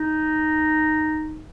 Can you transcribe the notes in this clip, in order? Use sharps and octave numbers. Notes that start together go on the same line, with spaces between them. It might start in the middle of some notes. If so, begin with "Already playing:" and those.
Already playing: D#4